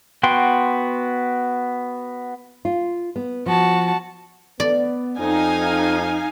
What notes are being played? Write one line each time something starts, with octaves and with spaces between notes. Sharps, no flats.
B3 F#4 G5 C6
F4
B3
F3 F#4 A5
B3 D5
F2 D#4 F5 G#5